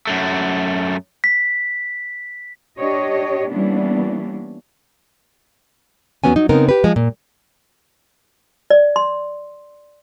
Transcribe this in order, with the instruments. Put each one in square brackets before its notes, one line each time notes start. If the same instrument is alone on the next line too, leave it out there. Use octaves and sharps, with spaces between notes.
[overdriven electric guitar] F#2 A3
[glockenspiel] B6
[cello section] D4 G4 C#5 D#5
E3 G3 A#3 B3 C#4 D4
[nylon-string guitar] E2 G#2 F#3 B3 C#4 G#5
F#3 D#4
C#3 B3 C4 D#4 A#4
G4 B4
F3 G#3
A#2
[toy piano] D5
C6